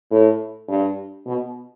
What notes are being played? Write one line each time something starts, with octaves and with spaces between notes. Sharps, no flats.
A2
G2
B2